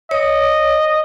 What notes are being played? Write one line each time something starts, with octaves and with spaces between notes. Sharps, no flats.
C#5 D#5